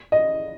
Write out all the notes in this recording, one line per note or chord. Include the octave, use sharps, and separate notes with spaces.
D#5